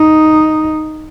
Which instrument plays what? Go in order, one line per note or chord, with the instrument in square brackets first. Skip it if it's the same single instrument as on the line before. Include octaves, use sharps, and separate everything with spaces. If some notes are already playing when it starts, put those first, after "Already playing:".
Already playing: [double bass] D#4